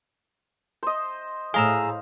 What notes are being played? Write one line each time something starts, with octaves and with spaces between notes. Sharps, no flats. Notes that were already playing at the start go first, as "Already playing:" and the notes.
C5 D#5
A2 G#4 F5 A#5 E6